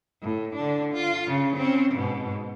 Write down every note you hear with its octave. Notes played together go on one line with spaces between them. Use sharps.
A2
D3 D4
F4
C#3
C4 C#4
G#2 B2